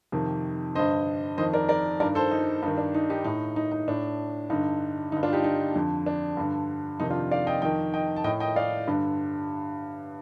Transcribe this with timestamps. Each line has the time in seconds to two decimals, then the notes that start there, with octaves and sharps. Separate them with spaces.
0.12 F2 C3 D#3
0.75 G2 D3 C5 D#5
1.37 F2 D#3 C5 D#5
1.53 A#4 D5
1.69 A#4 D5
2.00 G2 D#3 A#4 D5
2.15 A4 C5
2.31 D#4
2.62 G2 D#4
2.68 D#3
2.78 D4
2.94 D#4
3.10 D#4 G4
3.25 A2 D#4
3.56 D#4
3.72 D#4
3.88 A2 D4
4.50 G2 D3 D#4
5.12 G2 D3 D#4
5.23 D4 F4
5.33 D#4 G4
5.44 D#4
5.75 F2 D3
6.06 D4
6.37 G2 D3
7.00 F2 C3 D#3 D#4
7.10 D4 F4
7.31 D5 F5
7.47 D#5 G5
7.62 F2 D#3 D#5 G5
7.94 D#5 G5
8.16 A5
8.24 A2 D#5 G5
8.40 D#5 G5
8.56 D5 F5
8.87 G2 D3